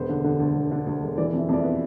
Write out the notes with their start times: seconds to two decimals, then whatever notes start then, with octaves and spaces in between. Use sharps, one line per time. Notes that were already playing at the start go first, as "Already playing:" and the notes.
Already playing: E1 B3 C5
0.09 D3
0.24 D3
0.40 D2
0.56 E1
0.71 D3
0.86 D2
1.02 E1
1.17 E3 D5
1.33 F2 E5
1.48 F2 D5
1.59 E5
1.64 B3